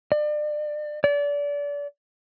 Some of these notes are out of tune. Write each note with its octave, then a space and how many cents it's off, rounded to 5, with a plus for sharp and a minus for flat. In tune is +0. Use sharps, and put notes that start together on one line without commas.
D5 +35
D5 -30